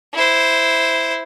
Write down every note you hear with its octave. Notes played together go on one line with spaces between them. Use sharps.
E4 C5